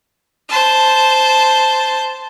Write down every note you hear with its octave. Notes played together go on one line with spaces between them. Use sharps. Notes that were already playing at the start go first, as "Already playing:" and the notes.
C5 A5